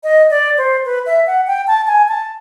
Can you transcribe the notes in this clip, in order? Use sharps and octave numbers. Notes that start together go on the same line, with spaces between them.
D#5
D5
C5
B4
E5
F#5
G5
A5
G#5
A5